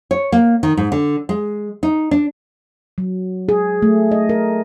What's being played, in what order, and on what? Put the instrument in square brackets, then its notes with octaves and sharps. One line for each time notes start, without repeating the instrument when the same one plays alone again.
[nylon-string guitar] C#5
A#3
D#3
G#2
D3
G#3
D#4
D4
[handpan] F#3
G#4
A3
D#5
A#4